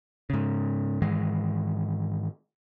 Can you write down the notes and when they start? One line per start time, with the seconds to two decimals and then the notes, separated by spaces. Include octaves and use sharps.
0.30 G#2 C#3
1.02 G#2 D#3 E3 G#3